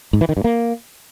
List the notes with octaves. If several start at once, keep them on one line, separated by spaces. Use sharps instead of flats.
G#2
E3
D#3
G2
A#3